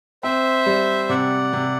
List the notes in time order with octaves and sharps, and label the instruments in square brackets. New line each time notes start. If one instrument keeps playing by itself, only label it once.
[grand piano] C4 [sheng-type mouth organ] C5 E5
[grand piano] G3
[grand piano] C3 [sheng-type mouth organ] D5 F#5
[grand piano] C3